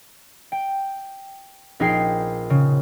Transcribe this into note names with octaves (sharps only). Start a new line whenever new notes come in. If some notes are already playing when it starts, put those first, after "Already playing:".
G5
A#1 D#4 G#4 G5 C7
C#3